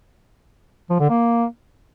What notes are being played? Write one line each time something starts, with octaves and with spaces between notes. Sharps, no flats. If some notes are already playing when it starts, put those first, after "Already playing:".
F3
D3
A#3